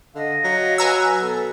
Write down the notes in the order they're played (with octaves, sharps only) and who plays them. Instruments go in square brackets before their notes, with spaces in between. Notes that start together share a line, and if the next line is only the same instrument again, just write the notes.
[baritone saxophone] D3 [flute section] D#5 F5
[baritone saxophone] F#3
[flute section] B4 [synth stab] G#5 A#5 E6
[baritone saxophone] B2 [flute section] A4